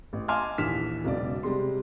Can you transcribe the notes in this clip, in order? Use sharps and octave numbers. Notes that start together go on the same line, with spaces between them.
A1
D#5 G#5 A5 C6 D6 F6
A#1 D#2 E3 F6 B6 E7
E1 B1 C#3 D5
C3 G3 G#3 C6